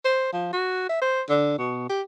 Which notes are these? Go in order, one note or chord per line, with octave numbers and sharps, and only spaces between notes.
C5
F3
F#4
E5
C5
D3
B2
G4